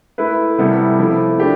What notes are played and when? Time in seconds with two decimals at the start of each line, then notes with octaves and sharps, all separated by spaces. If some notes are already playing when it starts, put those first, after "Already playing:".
0.18 A3 E4 B4
0.58 C3 G3 B3 E4 A4
0.99 F3 A3 E4
1.40 A3 D4 G4